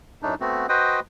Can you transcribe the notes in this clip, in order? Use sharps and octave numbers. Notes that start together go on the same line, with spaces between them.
F#2 A2 A3 D4 D#4
A3 B3 C4 F#4
F#4 B4 C5 D#5 G5 D#6